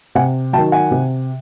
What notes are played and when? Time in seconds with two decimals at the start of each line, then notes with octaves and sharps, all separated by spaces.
0.15 C3 F#5 G#5
0.53 F#3 G5 A5
0.57 D#3
0.72 F#5 G#5
0.91 C3